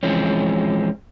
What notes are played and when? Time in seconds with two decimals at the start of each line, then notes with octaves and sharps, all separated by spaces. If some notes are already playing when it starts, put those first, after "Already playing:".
0.03 E3 F3 G#3 C4 C#4